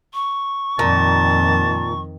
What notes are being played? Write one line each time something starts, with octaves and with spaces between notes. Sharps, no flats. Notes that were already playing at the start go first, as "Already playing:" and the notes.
C#6
F2 A#2 D#3 A5